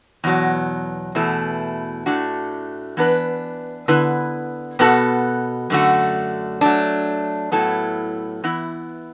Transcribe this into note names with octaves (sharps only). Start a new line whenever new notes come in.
E2 B2 F#3
E2 B2 A3 E4
A2 A3 D4 F#4
E3 B3 D4 B4
D3 B3 E4 B4
B2 B3 F#4 A4
F#2 D3 A3 F#4
F#3 A3 D4
A2 F#3 B3 E4 A4
E3 B3 E4